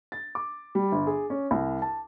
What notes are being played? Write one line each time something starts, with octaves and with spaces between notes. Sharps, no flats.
A6
D6
G3
G1
G#4
C#4
C2
A5